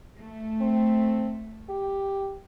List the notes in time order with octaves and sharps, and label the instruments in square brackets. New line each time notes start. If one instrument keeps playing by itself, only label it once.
[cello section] A3
[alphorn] C4
G4